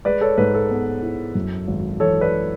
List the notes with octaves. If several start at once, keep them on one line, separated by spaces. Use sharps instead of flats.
G#3 B4 D5
A4 C#5
G#2 B4
A4
B3
E4
F#2
G#1
E3 A4 C#5
B4 D5